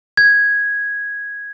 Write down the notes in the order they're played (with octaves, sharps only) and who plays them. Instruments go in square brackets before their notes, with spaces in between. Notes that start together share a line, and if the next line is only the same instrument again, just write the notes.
[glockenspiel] G#6